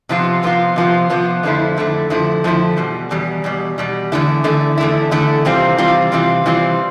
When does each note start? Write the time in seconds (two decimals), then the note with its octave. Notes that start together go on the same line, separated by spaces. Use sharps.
0.09 C3 F3 B3 F4
0.43 C3 F3 B3 F4
0.76 C3 F3 B3 F4
1.10 C3 F3 B3 F4
1.43 F2 D3 F3 A3 E4
1.76 F2 D3 F3 A3 E4
2.10 F2 D3 F3 A3 E4
2.44 F2 D3 F3 A3 E4
2.77 E2 B2 G3
3.11 E2 B2 G3
3.44 E2 B2 G3
3.78 E2 B2 G3
4.12 E2 D3 A3 E4
4.44 E2 D3 A3 E4
4.78 E2 D3 A3 E4
5.11 E2 D3 A3 E4
5.45 C3 E3 G3 C4 F4
5.78 C3 E3 G3 C4 F4
6.12 C3 E3 G3 C4 F4
6.46 C3 E3 G3 C4 F4